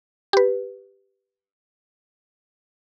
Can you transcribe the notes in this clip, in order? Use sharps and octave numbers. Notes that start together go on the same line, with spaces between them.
G4 B4